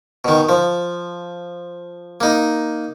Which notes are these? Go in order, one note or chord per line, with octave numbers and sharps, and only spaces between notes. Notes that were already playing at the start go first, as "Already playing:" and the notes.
B2 D#3
F3
A#3 D#4